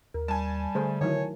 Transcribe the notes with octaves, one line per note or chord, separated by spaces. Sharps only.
D#2 A#4
G3 G#5 A5
D3 A3 G#4 C5
D#3 F#3 E4 C#5